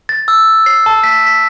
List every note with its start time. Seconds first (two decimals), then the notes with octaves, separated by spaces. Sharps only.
0.09 A6
0.28 E6
0.66 C7
0.86 A5
1.04 B6
1.27 B6